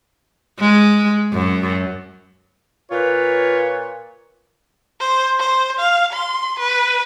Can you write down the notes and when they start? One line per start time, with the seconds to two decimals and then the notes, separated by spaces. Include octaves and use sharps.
0.59 G#3
1.32 F#2
2.91 A#2 F4 B4 C#5
5.00 C5
5.39 C5
5.79 F5
6.13 C6
6.60 B4